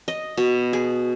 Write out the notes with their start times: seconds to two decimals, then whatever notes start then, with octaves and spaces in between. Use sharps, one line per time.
0.08 D#5
0.37 B2
0.73 G#4